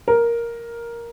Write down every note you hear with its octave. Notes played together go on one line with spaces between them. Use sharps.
A#4